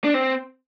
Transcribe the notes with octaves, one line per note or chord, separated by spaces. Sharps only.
D4
C4